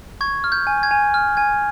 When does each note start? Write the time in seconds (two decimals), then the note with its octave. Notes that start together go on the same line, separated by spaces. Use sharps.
0.21 C#6 G#6
0.44 F6
0.52 G6
0.67 G#5
0.83 G#6
0.91 G#5
1.14 F6
1.37 G#5 G#6